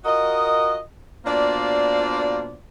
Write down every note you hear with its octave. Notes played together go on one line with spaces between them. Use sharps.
F4 F#4 A#4 D#5
B2 A#3 D4 F4 C5 D5